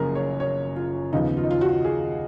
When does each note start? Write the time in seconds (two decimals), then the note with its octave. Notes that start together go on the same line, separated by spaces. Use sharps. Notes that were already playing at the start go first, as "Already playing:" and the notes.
Already playing: F#1 F#2 F3 A#3 G#4 A#4
0.15 C#5
0.40 C#5
0.76 F4
1.12 D#2 C#3 F3 B3 D#4
1.37 F4
1.44 D#4
1.51 F4
1.61 F#4
1.85 G#4